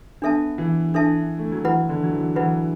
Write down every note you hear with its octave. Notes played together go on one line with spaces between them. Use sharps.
B3 D4 A4 E5 A5
E3
D4 A4 E5 A5
A3
F#3
E3 E4 B4 F#5 B5
D3
F#3
E3
E3 E4 B4 F#5 B5